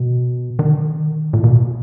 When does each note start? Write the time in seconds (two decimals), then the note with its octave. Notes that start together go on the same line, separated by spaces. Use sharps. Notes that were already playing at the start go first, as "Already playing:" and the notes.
Already playing: B2
0.59 D#3
1.33 A#2
1.44 B2